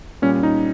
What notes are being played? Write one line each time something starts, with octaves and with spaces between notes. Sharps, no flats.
A#2 G3 C#4
D#4